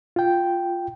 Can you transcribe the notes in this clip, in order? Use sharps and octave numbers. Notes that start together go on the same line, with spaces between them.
F4 G5